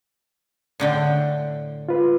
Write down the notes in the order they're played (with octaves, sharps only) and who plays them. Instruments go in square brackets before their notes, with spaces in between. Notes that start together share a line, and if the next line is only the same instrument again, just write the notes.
[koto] A2 D3 G5
[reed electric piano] F4 B4